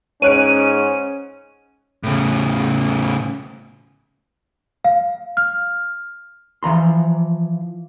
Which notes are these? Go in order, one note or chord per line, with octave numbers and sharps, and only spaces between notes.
G#2 C#4 C#5 F#6 D7 D#7
A2 C#3
F5
F6
E3 F3 A#5 C6